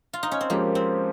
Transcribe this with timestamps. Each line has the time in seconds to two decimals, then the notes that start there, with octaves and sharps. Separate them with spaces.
0.13 F4
0.23 D#4
0.32 C#4
0.41 C4
0.50 F3 G#3 A#3 C#4 G4
0.75 C4